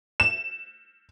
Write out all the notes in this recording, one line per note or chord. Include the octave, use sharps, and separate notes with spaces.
E7